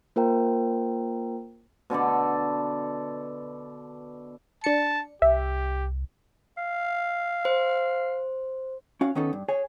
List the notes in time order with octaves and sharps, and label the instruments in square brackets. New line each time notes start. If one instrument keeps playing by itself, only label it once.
[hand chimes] A#3 F4 A#4 C5 G5 A#5
[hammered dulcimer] B2 D3 A4 D5
[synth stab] D4 C#7 [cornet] A5
[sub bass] C2 [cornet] G4 [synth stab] E5
[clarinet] F5
[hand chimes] C5
[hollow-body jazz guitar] C#4 F#4 F5
D#3 B3 C#4 D#4 A4
G2
G#4 C#5 G#5